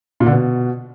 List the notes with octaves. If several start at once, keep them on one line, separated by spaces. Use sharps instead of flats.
A#2
D3
B2